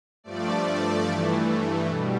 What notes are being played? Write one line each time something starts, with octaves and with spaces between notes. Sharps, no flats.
G2 F3 A3 D5
G2 E3 A3
B2 G3